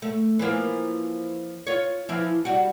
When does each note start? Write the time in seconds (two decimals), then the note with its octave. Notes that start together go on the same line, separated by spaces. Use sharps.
0.02 A3
0.39 E3 F3 A#3
1.67 F4 C#5
2.09 E3 F3 E4
2.45 G3 F#4